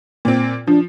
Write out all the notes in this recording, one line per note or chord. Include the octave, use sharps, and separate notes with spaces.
A#2 C4
F3 D4